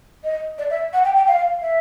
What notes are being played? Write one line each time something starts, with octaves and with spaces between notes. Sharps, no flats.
D#5
D5
E5
F#5
G5
G5
F5
E5